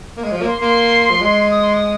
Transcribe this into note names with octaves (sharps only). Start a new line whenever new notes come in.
A#3
G#3
F3
A#3
C6
A#3 C6
F3
G#3
D#6
C6
D#6